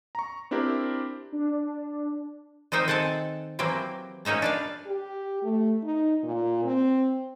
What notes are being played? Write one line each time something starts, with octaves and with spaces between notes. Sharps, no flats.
A#5 C#6
C4 D4 E4 G4 A#4 C5
D4
D#3 C4 D#4 C5 E5
C4 A4 F#5 G#5 A5
E3 F#3 A#3 C4 G4
A#3 C#4 D#4 E5 A#5
D4 B4 F5
G4
A3
D#4
A#2
C4